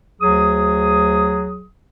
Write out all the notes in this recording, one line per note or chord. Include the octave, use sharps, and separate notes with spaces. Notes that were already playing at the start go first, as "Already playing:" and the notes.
D2 F#3 G#4 D#6